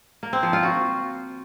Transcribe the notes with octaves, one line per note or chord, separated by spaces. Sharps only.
A#3
C4
F3
F4
F#4